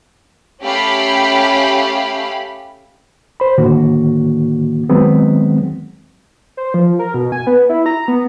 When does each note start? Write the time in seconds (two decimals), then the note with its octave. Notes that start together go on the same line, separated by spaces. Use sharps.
0.62 A3 C#4 G4 F5 B5
3.40 C5 B5
3.58 A2 D3 D#3 A#3 F#4
4.89 D#3 F#3 G#3 B3 C4
6.57 C5
6.74 F3
6.99 A#4
7.14 B2
7.32 G#5
7.47 B3
7.69 E4
7.86 A#5
8.08 B3